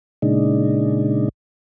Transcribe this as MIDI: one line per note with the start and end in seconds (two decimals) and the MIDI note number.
0.22 1.29 46
0.22 1.29 49
0.22 1.29 56
0.22 1.29 62
0.22 1.29 63